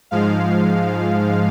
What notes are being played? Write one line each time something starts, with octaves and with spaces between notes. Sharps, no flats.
G#2 F3 G#3 F5